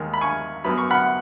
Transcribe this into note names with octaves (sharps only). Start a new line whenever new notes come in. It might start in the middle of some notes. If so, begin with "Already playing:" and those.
Already playing: D#2 D#3 G#3
B5
G#5 C#6
F#2 F#3 B3 B5
C#6
F#5 B5